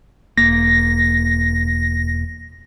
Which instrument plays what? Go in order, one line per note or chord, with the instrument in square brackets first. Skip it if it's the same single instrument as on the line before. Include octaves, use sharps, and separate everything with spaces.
[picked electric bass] E1 A#3 [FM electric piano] A#6